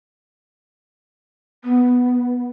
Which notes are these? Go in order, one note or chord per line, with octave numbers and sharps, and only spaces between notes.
B3